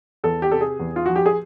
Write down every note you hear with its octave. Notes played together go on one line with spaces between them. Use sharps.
E2 A4
G4
C3 A4
G#4
E2
F4
F3 F#4
G4
G#4